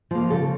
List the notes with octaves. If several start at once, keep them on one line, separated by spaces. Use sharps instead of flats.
F3 A#3
C#3 A4